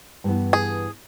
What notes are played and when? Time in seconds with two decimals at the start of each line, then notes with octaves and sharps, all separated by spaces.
0.24 G2 E3 B3
0.53 G#4